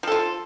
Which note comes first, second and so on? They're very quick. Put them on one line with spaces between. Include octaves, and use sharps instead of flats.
F3 A4 F4